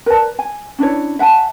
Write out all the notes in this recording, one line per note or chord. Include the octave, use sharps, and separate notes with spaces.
A#4 B4 D5 A5
G#5
C#4 D4 E4 C#5
E5 F#5 G#5 A5